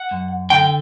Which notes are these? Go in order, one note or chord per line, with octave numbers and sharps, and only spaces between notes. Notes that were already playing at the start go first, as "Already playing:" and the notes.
Already playing: F#5
F#2
D3 G5